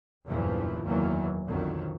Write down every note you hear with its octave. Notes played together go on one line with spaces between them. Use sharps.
F#1 E2 G2 A#2 E3 F3
F#1 E2 D#3 E3 F#3 A#3
B1 F2 D3 D#3 F#3